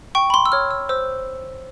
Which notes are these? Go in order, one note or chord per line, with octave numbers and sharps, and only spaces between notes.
G5 C#6
B5
C6
E6
C#5 F6
E6
C5 E6